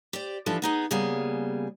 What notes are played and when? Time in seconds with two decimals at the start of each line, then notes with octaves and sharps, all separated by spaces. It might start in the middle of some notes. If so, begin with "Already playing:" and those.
0.13 G4 C5 D5
0.46 E3 F3 D4 F4 G4 A4
0.62 B3 D#4 G#4
0.91 C#3 G3 A#3 B3 G#4